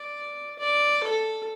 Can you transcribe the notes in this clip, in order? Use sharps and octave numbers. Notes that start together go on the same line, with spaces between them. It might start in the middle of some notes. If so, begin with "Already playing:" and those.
Already playing: D5
D5
A4